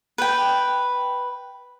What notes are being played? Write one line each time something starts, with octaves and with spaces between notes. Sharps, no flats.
B4 G5